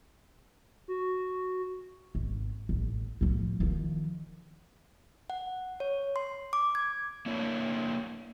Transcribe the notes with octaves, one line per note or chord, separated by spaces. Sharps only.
F#4
G#1
A1
A2 F3
D#3 F3
F#5
C#5
C6
D6
G#6
A#3 D4 E4 C#5